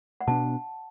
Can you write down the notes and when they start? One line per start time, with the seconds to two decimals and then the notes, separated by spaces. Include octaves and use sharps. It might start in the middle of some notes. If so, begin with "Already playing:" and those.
0.21 F#5
0.27 B2 B3 D4 A5